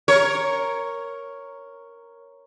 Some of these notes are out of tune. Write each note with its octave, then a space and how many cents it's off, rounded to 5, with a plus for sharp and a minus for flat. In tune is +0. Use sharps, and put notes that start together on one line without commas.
A#4 +0 C#5 +0